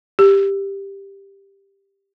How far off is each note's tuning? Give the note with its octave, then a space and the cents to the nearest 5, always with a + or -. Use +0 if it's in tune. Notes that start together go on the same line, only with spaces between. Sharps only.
G4 +10